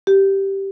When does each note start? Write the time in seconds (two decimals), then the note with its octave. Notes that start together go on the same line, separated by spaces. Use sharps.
0.07 G4